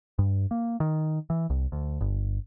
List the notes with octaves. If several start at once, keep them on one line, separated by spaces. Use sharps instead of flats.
G2
A#3
D#3
E3
C2
D2
G1